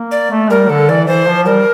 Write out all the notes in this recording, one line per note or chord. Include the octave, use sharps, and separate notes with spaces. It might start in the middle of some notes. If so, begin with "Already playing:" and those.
Already playing: A#3
D5
A3
G3 A#4
D3 A4
E3 D5
E3 C5
F3
G3 A#4